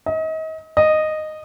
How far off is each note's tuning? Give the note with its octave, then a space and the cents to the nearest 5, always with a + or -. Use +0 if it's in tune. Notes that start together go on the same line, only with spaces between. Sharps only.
D#5 +35
D#5 -10